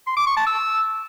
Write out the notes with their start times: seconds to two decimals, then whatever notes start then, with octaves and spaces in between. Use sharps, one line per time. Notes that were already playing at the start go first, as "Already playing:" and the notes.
0.07 C6
0.17 D6
0.27 C#6
0.37 A5
0.47 E6